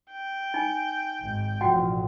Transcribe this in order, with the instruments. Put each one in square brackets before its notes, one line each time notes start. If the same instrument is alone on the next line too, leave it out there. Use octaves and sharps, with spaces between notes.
[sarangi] G5
[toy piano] D#4 G#5
[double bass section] G#1
[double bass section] A1 B2 F3 [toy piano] F#4 F#5 G5